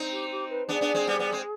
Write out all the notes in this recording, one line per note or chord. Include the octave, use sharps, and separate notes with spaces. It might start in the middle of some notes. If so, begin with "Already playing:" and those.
Already playing: C4 D#4
G4
G4
B4
B3 D4 G#4
B3 D4
G#3 C4
G3 B3
G3 B3
G#3 C4